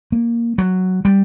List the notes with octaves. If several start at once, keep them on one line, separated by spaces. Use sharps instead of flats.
A#3
F#3
G3